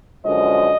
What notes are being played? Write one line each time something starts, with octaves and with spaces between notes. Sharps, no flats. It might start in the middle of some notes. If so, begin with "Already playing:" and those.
F#2 D3 F3 G#3 D#5